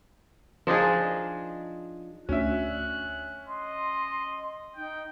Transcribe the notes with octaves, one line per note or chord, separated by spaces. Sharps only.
F3 D4 D#4 G#4
D2 C#4 E5 F#6
D#5 C6
D#4 G5